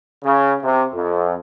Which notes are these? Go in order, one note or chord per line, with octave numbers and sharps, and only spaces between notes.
C#3
C3
F2